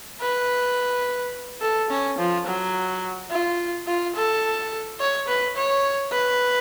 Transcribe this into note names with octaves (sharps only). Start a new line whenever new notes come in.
B4
A4
C#4
F3
F#3
F4
F4
A4
C#5
B4
C#5
B4